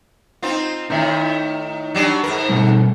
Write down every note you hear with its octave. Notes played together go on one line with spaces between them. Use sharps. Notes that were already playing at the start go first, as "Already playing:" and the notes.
C4 D#4 F4
A2 D#3 D#4 E5
F#3 G3 D4
G#2 A#4
B2 G3 A3